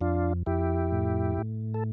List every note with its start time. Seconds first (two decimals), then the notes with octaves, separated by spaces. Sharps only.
0.01 F2 D4 F4
0.46 F2 E4 G4
0.92 A2
1.38 A2
1.74 A4